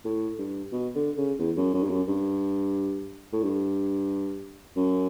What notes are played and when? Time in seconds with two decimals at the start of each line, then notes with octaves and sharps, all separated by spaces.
0.04 A2
0.38 G2
0.72 B2
0.95 D3
1.17 C#3
1.39 E2
1.57 F#2
1.74 F#2
1.83 G2
1.90 F#2
2.08 G2
3.32 A2
3.42 G2
4.77 F#2